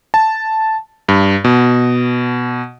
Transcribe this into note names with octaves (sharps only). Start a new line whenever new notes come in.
A5
G2
B2